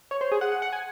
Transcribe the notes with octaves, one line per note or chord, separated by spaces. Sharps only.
C#5
C5
G#4
F#5
F#5
F#5
G#5